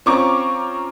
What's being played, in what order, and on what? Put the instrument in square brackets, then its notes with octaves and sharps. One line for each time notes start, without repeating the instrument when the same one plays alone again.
[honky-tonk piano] C4 C#4 F4 A#5 C#6 D6